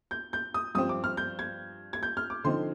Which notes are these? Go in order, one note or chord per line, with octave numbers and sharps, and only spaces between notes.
G6
G6
D#6
G2 F3 C4 D#6
D6
F6
G6
G#6
G#6
G6
F6
D6
D3 F3 C4 D#4 C6